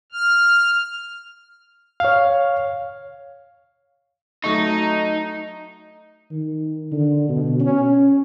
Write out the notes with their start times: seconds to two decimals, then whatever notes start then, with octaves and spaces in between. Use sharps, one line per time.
0.12 F6
2.00 C#5 F5
4.44 F#3 A3 D#4 C#6
6.31 D#3
6.92 D3
7.29 B2
7.60 C#4